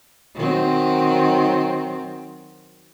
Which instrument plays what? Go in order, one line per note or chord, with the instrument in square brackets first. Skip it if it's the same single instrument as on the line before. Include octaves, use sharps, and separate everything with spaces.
[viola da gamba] D#3 F#3 C4